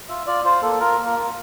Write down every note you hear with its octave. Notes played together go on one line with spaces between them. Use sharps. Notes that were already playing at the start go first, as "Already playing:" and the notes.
F4 E5
F4 D5
F4 C5
A#3 A4
F4 A#4
A#3
A#4
F4